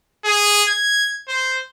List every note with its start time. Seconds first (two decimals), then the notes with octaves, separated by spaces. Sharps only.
0.25 G#4
0.68 G#6
1.28 C5